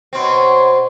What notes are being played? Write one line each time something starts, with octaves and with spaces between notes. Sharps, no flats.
B2 C4 C#5 C6